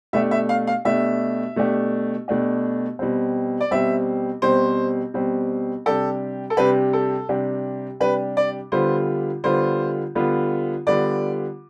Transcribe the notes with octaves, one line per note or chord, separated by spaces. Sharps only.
B2 A3 D4 G4 E5
E5
F5
F5
B2 A3 D4 G4 E5
B2 A3 D4 G4
B2 A3 D4 G4
B2 G3 C4
D5
B2 G3 C4 E5
B2 G3 C4 C5
B2 G3 C4
C3 G3 D4 G4 A4
A4
C3 G3 D4 G4 B4
A4
C3 G3 D4 G4
C3 G3 D4 G4 B4
D5
D3 G3 B3 F4 C5
D3 G3 B3 F4 C5
D3 G3 B3 F4
D3 G3 B3 F4 D5